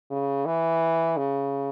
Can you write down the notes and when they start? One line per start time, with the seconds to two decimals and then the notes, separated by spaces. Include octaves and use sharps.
0.10 C#3
0.46 E3
1.17 C#3